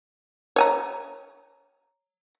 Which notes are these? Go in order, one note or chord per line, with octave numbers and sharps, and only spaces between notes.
C#5 G#5 A#5